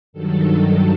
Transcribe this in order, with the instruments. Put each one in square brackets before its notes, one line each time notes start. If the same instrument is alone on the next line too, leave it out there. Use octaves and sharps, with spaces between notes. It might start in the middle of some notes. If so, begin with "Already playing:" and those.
[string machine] G2 D#3 F#3 A4